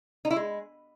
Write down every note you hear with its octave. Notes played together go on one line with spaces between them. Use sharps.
D#4
E4
G#3